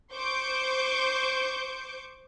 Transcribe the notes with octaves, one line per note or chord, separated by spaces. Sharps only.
C5 C#6 D6 G6